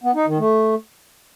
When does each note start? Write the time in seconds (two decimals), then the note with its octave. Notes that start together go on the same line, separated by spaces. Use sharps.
0.03 B3
0.15 D#4
0.27 D#3
0.39 A3